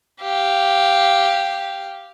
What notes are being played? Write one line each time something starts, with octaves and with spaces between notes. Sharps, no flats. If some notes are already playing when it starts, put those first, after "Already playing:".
G4 F5